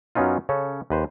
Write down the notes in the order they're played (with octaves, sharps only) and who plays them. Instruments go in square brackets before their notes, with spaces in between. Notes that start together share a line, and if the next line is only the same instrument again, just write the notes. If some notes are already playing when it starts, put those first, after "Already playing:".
[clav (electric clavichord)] F#2 F#3 B3 C#4 D#4 F4
C#3 C#4 A4
D#2 B4 C5